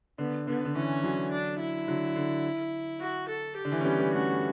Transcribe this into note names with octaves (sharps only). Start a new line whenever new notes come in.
D3 B3
D3 B3
D3
E3 C#4
D3 F#3
D4
E4
D3 F#3
D3
F#4
A4
G4
D3
E3
C#4
G3 B3
G3 B3
A3 C#4 F#4